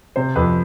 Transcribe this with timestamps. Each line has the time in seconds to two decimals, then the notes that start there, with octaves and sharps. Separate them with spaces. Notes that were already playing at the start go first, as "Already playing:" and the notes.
0.16 C3 C5
0.35 F2 B4